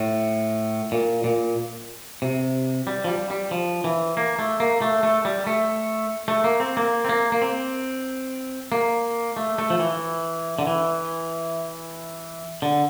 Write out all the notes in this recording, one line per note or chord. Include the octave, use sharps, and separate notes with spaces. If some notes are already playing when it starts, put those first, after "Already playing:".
Already playing: A2
A#2
A#2
C3
G3
F3
G3
G3
F3
E3
A#3
A3
A#3
A3
A3
G3
A3
A3
A#3
C4
A#3
C4
A#3
A#3
C4
A#3
A3
A3
F3
E3
D3
E3
D3